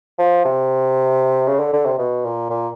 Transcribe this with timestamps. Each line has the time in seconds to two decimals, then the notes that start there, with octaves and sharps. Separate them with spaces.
0.19 F3
0.45 C3
1.47 C#3
1.60 D3
1.73 D3
1.86 C3
1.98 B2
2.25 A#2
2.50 A#2